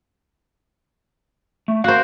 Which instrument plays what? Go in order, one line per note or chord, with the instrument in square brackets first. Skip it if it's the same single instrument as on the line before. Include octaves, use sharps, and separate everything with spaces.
[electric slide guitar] A3
[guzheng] F#4 C5 [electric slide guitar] A#4 F5